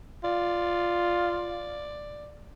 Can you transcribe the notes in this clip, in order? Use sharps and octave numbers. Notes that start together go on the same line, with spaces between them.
F4 D5